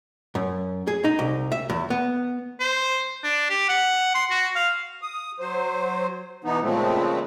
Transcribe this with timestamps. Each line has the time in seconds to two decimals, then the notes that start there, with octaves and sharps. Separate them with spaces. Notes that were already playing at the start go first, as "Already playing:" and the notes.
0.35 F#2
0.87 G#4
1.04 D#4
1.19 C2
1.52 E5
1.70 E2
1.90 B3
2.60 C5
3.24 D4
3.50 G4
3.69 F#5
4.15 C6
4.31 F#4
4.56 F5
5.02 D#6
5.40 F#3 C5
6.44 B2 E3 B3 D#4
6.62 A#2 C#3 F3 G#3 A3 C4